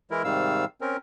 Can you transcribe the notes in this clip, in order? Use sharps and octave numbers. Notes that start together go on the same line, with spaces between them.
E3 G#3 E4 A#4
G#2 C3 D#3 G3 F5 E6
C4 C#4 A#4